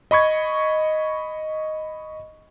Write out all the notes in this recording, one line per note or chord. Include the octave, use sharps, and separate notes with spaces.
D#5 B5 C#6 G#6